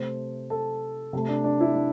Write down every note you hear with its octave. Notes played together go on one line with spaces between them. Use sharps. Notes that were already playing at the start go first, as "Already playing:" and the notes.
Already playing: C3 A3 C5
A4
C3 A3
D4
D4
E4
D4